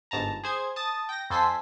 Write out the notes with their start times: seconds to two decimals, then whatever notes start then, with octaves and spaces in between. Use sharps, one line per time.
0.11 G1 G#2 A5 A#5
0.44 G#4 C5 G#6
0.76 A5 D#6 A6
1.09 G5 A#6
1.30 F2 A4 C5 G#5 C6 B6